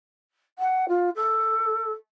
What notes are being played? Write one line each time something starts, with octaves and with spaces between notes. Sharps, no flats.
F#5
F4
A4